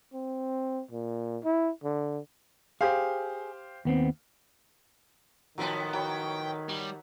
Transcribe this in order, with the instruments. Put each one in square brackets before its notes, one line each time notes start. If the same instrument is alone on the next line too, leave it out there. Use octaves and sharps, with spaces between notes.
[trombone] C4
A#2
E4
D3
[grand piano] G4 C5 F5 [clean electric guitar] G#4
[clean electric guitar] D#2 B3 C4
[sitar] A2 F3 B3 [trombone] D#3 [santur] F#3 A5
[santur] F#3 C#5 B5 [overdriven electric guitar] G5
[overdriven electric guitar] G3